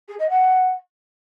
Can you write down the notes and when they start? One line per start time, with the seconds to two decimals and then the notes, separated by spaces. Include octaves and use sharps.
0.08 G#4
0.19 D#5
0.29 F#5